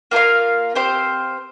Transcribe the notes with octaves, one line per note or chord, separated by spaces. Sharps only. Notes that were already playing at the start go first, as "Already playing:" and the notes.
A#3 F4 A#4 F5
C4 G4 C5 F5